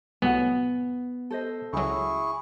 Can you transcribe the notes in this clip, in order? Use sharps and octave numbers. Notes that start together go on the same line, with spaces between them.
C2 A2 F#3 B3 F#5 G#5
A4 C5 D#5
C#2 F#3 E4 G#4 C#6